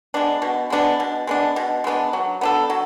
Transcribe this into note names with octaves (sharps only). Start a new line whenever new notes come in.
G#3 B3 D4
B2
G#3 B3 D4
B2
G#3 B3 D4
B2
G#3 B3 D4
F#3
B3 D4 A4
F#3